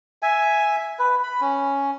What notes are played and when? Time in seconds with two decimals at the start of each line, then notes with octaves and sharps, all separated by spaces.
0.23 E5 G#5
0.99 B4
1.23 B5
1.41 C#4